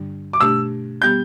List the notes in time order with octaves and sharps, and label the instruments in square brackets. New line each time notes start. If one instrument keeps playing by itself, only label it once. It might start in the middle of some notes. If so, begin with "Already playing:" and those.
Already playing: [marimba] G2 D3 G3 D4
[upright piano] D6
[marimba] B2 A3 D4 G4 [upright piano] E6
[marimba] G3 B3 G4 [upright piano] G6